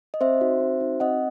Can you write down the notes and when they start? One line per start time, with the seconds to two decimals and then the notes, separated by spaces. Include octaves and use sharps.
0.14 D#5
0.21 C4 C5 E5
0.41 D#4 F#4
0.60 C4
0.80 D#4 F#4
1.00 C4 D#5 F#5